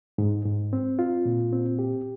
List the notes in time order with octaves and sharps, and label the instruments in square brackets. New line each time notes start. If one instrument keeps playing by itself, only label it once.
[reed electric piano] G#2
G#2
C4
F4
A#2
C4
G4